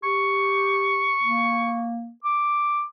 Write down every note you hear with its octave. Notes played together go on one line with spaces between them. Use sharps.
G4 C#6
A#3
D6